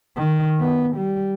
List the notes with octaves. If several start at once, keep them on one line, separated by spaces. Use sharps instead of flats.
D#3
B3
G3